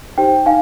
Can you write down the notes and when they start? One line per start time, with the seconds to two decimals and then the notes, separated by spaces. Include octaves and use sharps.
0.18 D#4 G4 C5 G5
0.46 D#4 F5 G#5